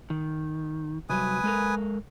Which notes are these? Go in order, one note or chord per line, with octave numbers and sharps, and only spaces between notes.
D#3
C3 F#3 G3 B4 G#5 D#6
G#3 A4 A#4